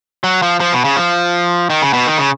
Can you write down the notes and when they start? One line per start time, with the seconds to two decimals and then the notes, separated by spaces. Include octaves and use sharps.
0.24 F#3
0.42 F3
0.60 F3
0.73 B2
0.84 C#3
0.96 F3
1.70 D#3
1.82 C#3
1.93 B2
2.07 D#3
2.18 C#3